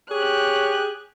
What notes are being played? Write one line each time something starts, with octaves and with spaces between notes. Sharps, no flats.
G4 G#4 C#5 F#6